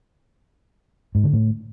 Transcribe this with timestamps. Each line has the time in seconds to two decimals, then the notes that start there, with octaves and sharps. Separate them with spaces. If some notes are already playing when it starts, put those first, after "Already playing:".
1.15 G#2
1.24 D3
1.33 A2